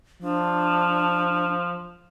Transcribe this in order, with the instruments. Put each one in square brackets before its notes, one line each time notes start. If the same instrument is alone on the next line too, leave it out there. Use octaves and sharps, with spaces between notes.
[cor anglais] F3 [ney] D4